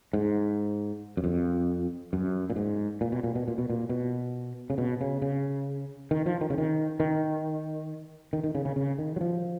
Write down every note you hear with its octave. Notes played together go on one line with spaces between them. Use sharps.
G#2
F#2
F2
F#2
A#2
G#2
A#2
B2
A#2
B2
A#2
B2
A#2
B2
C#3
B2
C#3
C#3
D#3
F3
D#3
C#3
D#3
D#3
D#3
D#3
C#3
C#3
C#3
D#3
F#3
F3